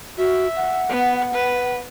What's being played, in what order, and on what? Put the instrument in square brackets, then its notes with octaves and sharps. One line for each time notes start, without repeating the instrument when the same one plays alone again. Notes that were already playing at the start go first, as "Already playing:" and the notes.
[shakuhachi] F#4 [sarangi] E5
[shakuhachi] F#5
[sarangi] B3
B4